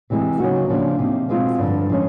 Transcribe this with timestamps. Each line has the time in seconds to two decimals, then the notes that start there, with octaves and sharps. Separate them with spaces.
0.10 C3 E3 G#3
0.40 C#3 F#3 A#3 D#4 F#4
0.69 C#3 F3 A#3 D4
0.99 C3 F3 A#3 D#4
1.29 B2 G#3 C4 F4
1.58 G2 D3 F3
1.90 F3 G#3 C#4